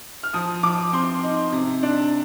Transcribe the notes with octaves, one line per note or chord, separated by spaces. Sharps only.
F6
F3 D#6
F3 D6
C4 C6
D#4
C3
D4